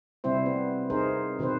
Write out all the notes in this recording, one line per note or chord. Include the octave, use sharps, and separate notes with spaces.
C3 G3 C4 E4 C5
B3
D#4 G#4 A#4 C5
B2 D#3 C4 B4 C5